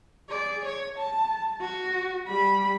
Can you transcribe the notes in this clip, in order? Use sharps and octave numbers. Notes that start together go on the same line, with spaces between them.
G#4 D5
C#5
A5
F#4
G3 B5